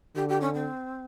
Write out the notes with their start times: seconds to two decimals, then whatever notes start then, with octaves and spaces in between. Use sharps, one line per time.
0.16 D3 G4
0.29 G4
0.41 C#4
0.54 C4